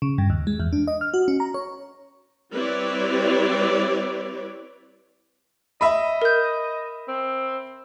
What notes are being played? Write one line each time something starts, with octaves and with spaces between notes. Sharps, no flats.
C#3
G2
D#2
G#3
E2
D4
D#5
F6
F#4
C#4
A#5
C#5
G3 C4 E4 B4 C#5 D5
D#5 E5 B5
A#4 G6
C4